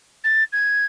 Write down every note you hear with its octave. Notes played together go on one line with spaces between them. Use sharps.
A6
G#6